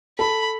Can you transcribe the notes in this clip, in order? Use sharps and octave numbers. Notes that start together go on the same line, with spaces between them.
A4 B5